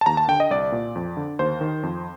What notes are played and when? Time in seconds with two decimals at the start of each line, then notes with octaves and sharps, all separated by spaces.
0.01 A5
0.06 D#2 A#5
0.17 A5
0.28 D3 G5
0.40 D#5
0.50 C2 D5
0.72 A#2
0.96 F2
1.17 D3
1.39 D#2 C5
1.61 D#3
1.83 F2